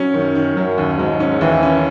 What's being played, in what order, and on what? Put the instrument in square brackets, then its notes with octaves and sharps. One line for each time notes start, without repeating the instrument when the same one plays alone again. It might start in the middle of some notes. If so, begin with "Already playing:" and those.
Already playing: [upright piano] F#3 C#4
[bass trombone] F#2 [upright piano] D#3
[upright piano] D#3
[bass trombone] F#2 [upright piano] F#3
[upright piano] D#2
[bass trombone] G#2 [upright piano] F#3
[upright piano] C#4
[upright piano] D#2 [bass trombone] E3
[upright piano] C#4